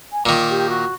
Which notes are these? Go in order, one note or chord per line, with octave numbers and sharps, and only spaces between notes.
G#5
A#2 D#3 D6
G4
F#4